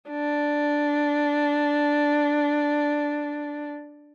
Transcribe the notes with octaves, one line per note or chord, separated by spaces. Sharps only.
D4